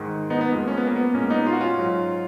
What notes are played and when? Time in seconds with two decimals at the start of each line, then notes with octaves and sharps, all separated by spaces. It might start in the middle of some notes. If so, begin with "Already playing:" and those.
Already playing: G#2 D#3 G#3
0.30 B3 D#4
0.41 B3
0.51 F2 F3 G#3 A#3
0.68 C#4
0.77 B3
0.87 A#3
0.96 B3
1.14 A#2 G#3 A#3 C#4
1.30 B3 D#4
1.46 F4
1.53 F#4
1.61 C#4 F4
1.77 G#2 F#3